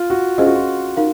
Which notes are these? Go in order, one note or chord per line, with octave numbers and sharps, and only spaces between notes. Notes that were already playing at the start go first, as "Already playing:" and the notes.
Already playing: F4
F#4
C#4 F4 G#4 C5 D#5
F#4
F4
D#4 A#4 F5